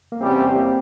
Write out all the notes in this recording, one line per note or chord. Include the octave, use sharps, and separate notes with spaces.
A#3
E2 C3 G3 C4 C#4 G4
C4
A#3